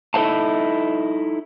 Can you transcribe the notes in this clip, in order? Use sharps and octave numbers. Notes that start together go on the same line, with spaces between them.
D#4 E4 A4 C5 F5 A5